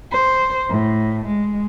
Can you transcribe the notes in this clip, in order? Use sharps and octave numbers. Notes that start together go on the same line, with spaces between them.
C5
A2
G#3